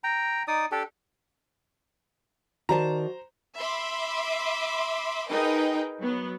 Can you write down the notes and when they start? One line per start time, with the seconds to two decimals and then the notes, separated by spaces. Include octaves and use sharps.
0.04 G5 A#5
0.48 D#4 D5 D#6
0.72 D4 G4 A4
2.69 D#3 F#4 C5 D5 A5 A#5
3.57 E5 B5 C6 D6
5.29 D#4 G#4 A#4 B4 D#5 G5
6.01 F#3 B3